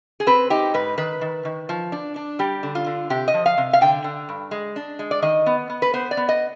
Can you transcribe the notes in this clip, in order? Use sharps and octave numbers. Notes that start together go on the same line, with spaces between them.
G#4
C4 B4
D#4 G4
G#2 B4
D#3 B4
D#3
D#3
F3
D4
D4
G3 G4
D3
F4
D3
C3 G4
D#5
F3
F5
C3
F5
D3 G5
D3
G2
G#3
D4
G#3
D5
D#3 D#5
B3
B3
B4
B3 C5
D5
B3
D#5